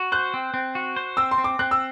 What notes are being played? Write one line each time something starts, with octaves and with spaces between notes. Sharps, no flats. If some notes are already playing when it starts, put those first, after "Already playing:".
Already playing: F#4
C5 F#6
C4
C4
F#4
C5
C4 E6
C6
C4
D6
C4 F#6
E6